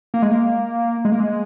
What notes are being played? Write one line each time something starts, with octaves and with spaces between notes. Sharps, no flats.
A#3
G#3
A#3
G#3
A#3
G#3